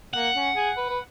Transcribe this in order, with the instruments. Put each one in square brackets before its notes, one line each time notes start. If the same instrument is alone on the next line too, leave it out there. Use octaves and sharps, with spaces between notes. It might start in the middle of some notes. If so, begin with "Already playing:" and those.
[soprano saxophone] A#3 [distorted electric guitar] F#5
[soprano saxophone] C#4
G#4
B4
B4